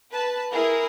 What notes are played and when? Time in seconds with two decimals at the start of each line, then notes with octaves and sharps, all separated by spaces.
0.11 B4 A5
0.53 E4 G#4 A#4